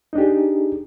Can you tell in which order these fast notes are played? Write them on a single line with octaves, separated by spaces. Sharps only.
D#4 D4 G4 G#4